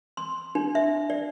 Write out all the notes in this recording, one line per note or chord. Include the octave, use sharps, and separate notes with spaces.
C6
D4
E5
D5